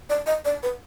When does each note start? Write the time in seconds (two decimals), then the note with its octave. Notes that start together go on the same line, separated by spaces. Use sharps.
0.10 D5
0.27 D#5
0.45 D5
0.63 B4